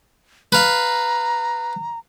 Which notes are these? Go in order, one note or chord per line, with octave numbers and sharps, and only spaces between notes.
B4 F5 A#5